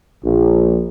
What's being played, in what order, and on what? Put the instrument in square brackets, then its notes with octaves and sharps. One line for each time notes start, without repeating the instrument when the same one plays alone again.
[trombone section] A#1